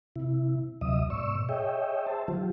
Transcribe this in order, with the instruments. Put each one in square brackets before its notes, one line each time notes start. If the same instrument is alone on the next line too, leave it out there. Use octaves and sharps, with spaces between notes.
[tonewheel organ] C3 E4
D2 C3 F#3 D#5 E5 D#6
G#2 B2 D5 C#6 E6
G#4 C#5 D#5 E5 G5
C5 E5 A5
D#3 F3 F#3 F4 G4